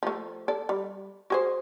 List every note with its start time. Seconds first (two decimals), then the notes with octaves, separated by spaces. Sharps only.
0.03 F3 A3
0.48 A4 D5
0.69 G3
1.30 F#4 G#4 C5